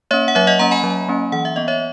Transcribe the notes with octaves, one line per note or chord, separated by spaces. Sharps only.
A#3 C#4 C#5 E5
F#5
F#3 C#5 E5
D#5 F#5
A#3 C#4 F#5 A#5
G#5 B5
F#3
A#3 C#4
E3 F#5
E5
B3 D#5
C#5 E5